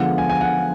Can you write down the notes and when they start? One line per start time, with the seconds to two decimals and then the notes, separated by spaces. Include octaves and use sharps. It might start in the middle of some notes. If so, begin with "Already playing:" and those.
Already playing: D3 F3 G#3 B3 F#5
0.18 G#5
0.29 G#5
0.41 F#5